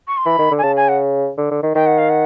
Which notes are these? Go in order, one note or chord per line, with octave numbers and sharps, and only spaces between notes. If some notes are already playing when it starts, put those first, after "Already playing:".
C#6
C6
E3 B5
D#3
D3
G#5
C#3 A5
G#5
F#5
D3
D3
D#3
D#3 G5
F#5
F5
F#5